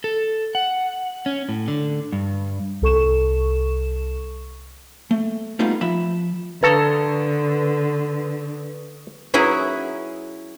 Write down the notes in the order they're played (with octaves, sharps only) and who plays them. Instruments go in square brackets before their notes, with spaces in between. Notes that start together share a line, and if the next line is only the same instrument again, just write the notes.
[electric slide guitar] A4
F#5
C#4
A2
D3
G2
[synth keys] C2 A4 C#6 E7
[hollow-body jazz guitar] A3
G3 A3 B3 D#4 F4 F5
F3 E5 B5
[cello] D3 [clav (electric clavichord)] A4 A#5 [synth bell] B4 C#6 D#6
[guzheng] F#3 C#4 E4 G#4 C#5 F#5